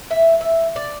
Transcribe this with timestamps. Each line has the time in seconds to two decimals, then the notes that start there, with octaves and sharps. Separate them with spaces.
0.11 E5
0.41 E5
0.76 D5